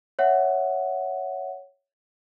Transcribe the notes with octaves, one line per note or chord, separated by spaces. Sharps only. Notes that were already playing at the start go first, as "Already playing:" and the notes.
C#5 E5 F#5